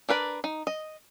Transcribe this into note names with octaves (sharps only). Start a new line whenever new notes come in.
D4 A#4 B4 D5
D#4
D#5